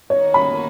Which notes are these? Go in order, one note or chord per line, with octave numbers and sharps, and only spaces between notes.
D#3 A#3 D#4 F#4 C#5
B5